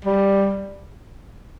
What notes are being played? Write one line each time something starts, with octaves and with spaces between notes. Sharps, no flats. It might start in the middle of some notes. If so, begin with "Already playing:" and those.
G3